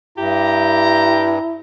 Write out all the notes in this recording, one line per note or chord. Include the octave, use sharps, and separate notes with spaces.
G2 E4 G4 A#5